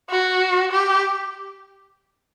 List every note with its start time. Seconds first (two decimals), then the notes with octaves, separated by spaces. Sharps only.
0.10 F#4
0.72 G4